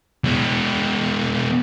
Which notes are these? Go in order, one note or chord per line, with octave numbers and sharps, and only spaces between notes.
B2 G#3